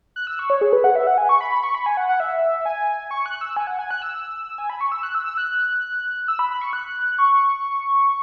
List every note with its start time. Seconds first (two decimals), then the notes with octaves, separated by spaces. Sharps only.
0.16 F#6
0.27 E6
0.39 C#6
0.50 C#5
0.61 G#4
0.73 B4
0.84 F#5
0.96 E5
1.07 F#5
1.18 G#5
1.29 C#6
1.41 B5
1.52 B5
1.64 C#6
1.75 B5
1.86 G#5
1.97 F#5
2.09 F#5
2.20 E5
2.65 G#5
3.11 C#6
3.26 F#6
3.41 E6
3.57 G#5
3.67 F#5
3.79 G#5
3.91 F#6
4.02 E6
4.58 G#5
4.70 B5
4.81 C#6
4.92 E6
5.03 F#6
5.15 E6
5.26 E6
5.38 F#6
6.28 E6
6.39 B5
6.51 B5
6.61 C#6
6.73 F#6
7.18 C#6